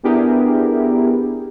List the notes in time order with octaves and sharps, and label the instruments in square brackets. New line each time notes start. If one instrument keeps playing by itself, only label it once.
[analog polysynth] B3 D4 E4 G4 G#4 A#4